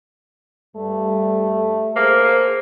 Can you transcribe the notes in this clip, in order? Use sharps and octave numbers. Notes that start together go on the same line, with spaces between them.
G2 G3 A3
A#3 G#4 C5